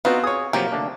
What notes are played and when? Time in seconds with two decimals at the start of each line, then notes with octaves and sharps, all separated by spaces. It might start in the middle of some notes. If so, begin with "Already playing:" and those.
0.05 B3 C4 D#4 F4 F#4
0.24 G#4 C#5 D#6
0.53 C3 F3 F#3 A#3 G4
0.72 D3 A3 D4